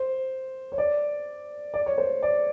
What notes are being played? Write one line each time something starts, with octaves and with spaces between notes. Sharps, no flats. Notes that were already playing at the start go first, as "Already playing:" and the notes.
Already playing: C5
C#5
D5
D5
C#5
C5
D5